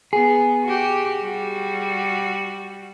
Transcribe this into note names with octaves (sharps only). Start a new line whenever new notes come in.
B3 G#4
F#4 G4
G3 F#4